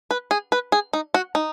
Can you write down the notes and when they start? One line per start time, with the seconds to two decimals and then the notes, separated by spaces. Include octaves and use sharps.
0.11 B4
0.31 G#4
0.52 B4
0.72 G#4
0.93 D#4
1.14 F#4
1.35 D#4